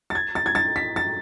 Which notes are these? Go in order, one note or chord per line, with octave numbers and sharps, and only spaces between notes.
A6
G#6
A6
G#6
A6
B6
A6